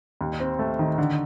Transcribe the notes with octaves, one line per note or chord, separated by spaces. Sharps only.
D#2
C4
A3
D#3
D3